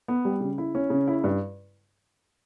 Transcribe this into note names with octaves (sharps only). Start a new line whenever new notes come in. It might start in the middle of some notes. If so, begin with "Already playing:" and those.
B3
G3
C#3
E4
C#4
C#3
E4
G2